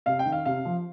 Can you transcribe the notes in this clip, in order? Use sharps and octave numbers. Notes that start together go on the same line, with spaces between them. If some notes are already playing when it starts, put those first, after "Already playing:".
C3 F5
G5
D#3
F5
C3 F5
F3